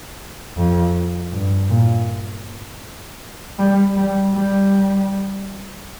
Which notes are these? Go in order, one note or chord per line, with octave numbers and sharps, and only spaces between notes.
F2
G2
A#2
G3
G3
G3